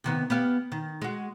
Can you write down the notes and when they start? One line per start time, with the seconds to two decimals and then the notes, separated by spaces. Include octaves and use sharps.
0.04 C3 D#3 B3
0.30 B3 G4 F5
0.72 D#3
1.02 G#3 F#4